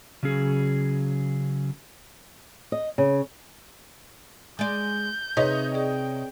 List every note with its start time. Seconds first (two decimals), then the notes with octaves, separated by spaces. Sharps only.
0.23 C#3 F#3 C#4 G#4
2.72 D#5
2.98 C#3
4.59 G#3 D5 G6
5.37 C3 D#4 G#4 B4 C#5 D#5
5.74 G#4 D5 G5